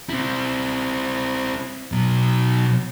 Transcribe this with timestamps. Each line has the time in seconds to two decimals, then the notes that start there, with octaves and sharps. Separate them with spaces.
0.10 C4 E4
1.92 B2 F#3